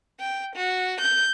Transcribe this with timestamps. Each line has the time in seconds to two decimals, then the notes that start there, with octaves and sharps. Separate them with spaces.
0.20 G5
0.55 F#4
1.00 G6